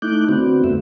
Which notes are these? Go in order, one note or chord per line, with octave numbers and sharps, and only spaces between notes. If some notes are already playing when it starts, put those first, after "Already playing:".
A3 D#4 E4 D6 F#6 G6
D3 B3 C4 F#4
F#2 A3 E5